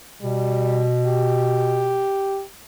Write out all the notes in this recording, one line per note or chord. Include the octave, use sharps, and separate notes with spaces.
B2 G3
G4